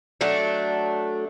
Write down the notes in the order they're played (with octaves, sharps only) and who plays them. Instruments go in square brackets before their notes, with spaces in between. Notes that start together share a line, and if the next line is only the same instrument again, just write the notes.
[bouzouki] F#3 A3 D4